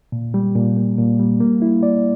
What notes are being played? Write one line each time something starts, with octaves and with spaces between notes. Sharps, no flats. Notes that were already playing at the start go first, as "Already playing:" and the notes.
A#2
G3
A#2
A#3
A#2
G3
A#3
E4
D5